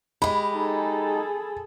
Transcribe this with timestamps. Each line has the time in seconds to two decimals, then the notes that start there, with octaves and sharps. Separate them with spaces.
0.22 G#3 G4 B5
0.55 D#4 G#4 A4